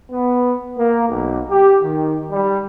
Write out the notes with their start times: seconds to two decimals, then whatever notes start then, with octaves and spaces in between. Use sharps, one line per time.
0.11 B3
0.77 A#3
1.09 B1
1.50 G4
1.83 D#3
2.31 G3